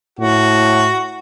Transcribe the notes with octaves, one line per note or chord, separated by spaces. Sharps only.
A2 F#4